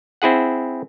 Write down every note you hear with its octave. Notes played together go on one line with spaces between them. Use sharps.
C4 E4 G#4 F#5